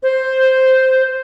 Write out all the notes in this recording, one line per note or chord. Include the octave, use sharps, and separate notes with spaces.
C5